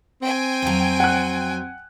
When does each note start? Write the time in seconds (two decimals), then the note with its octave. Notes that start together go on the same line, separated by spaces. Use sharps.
0.22 C4 G5 G#5
0.62 F2 F#3
1.00 F#5 F#6